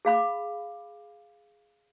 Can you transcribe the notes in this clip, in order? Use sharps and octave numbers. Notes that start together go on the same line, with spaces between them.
G#4 F5 B5 D6